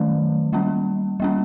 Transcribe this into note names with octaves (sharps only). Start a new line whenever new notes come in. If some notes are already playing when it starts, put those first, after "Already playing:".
Already playing: D#3 F#3 A3 C#4
G3 A#3 C#4
G3 A#3 C#4